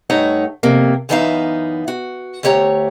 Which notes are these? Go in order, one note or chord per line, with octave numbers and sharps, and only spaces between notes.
G2 A3 D#4 C#5 F#5
F2 C3 A#3
F#2 E3 B3 D#4 E5 F5
F#4
D2 A3 G4 C#5 A#5